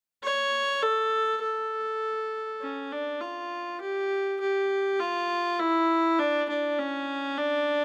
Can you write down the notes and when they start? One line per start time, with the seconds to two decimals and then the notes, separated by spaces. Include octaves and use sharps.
0.24 C#5
0.83 A4
1.42 A4
2.62 C#4
2.92 D4
3.21 F4
3.81 G4
4.41 G4
5.00 F4
5.60 E4
6.19 D4
6.49 D4
6.78 C#4
7.38 D4